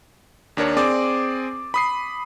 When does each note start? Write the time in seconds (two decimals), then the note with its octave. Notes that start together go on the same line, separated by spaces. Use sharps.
0.57 D#2 D4 A#4 C#5
0.77 C4 G#4 D5 D6
1.74 B5 D#6 C7